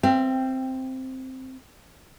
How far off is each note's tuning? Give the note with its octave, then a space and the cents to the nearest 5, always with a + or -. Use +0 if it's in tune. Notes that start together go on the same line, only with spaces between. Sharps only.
C4 +0 E5 +45 G5 +10